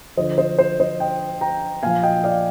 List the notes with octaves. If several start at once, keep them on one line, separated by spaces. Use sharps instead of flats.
D3 F3 C5 D#5
C5 D#5
C5
C5 D#5
D#5 G5
G5 A#5
A#2 F3 F5 G#5
D#5 G5
D5 F5